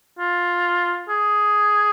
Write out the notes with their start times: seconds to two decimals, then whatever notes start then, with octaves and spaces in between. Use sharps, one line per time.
0.19 F4
1.09 G#4